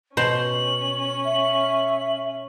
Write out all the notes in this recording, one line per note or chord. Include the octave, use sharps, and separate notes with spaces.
B2 C#4 C5 F#7
E5